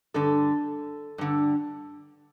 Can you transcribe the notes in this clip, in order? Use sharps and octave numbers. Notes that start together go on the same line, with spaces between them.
G2 D3 A4
G2 D3